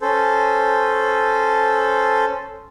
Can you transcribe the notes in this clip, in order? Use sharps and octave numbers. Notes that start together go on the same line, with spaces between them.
C#4 A4 C5